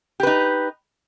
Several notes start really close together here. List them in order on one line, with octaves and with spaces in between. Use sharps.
G4 B4 D#4